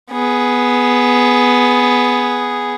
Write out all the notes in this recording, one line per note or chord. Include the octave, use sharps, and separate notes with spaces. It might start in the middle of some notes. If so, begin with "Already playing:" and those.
B3 G#4